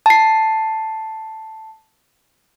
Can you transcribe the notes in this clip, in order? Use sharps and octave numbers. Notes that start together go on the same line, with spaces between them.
A5 C7